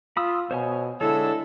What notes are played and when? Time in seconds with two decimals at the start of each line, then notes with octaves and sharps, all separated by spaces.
0.17 F4 B5 D#6 E6
0.51 B2 C5 C#5 G#5
1.01 D3 G#3 E4 A4 C#5 E6